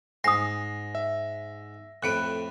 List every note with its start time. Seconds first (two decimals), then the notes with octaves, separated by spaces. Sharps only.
0.24 G#2 G#5 D#6 A#6 C7
0.95 E5
2.03 F2 A2 B4 F#6 C#7 D7